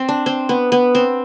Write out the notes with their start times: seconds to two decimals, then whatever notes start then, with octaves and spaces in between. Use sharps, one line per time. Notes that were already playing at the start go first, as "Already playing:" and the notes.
Already playing: C4
0.09 D4
0.26 C4
0.49 B3
0.72 B3
0.95 C4